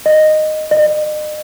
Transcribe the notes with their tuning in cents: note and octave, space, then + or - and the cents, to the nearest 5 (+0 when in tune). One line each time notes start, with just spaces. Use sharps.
D#5 -10
D#5 -40